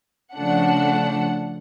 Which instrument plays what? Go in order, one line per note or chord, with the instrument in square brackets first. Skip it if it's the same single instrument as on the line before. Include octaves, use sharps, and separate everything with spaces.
[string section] C#3 F3 A3 D4 F#5